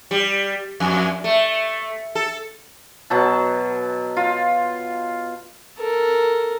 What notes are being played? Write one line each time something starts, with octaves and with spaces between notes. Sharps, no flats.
G3
F2
A3
A4
B2 F#3 A5
F4
A4 A#4